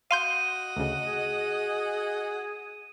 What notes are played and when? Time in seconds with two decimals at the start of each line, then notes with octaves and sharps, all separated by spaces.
0.11 F#4 D#5 F5 C6 G6 D#7
0.77 D2 C#3
1.03 G#4